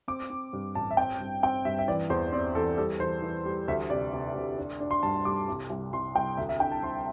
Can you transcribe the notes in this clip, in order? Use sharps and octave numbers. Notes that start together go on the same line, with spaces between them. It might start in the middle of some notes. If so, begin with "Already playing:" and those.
C4 D6
C4
G2
A1 A5
E5
C4 G5
G2
C4 G5
G2 E5
E5
E3 D5
E2 C5
C4 D5
E3 A4
G3 A4
E3 C5
E3
G3
D2 E5
C3 D5
C3
D2
D4
D4
C6
G2 A5
G3 D6
C2
C2
C2 C6
C2 G5
D2 E5
E5
D3 G5
A5
C4 C6